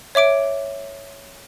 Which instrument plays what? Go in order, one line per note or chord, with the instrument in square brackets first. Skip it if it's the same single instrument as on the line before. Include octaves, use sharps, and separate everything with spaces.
[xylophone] C#5 E5 D6 D7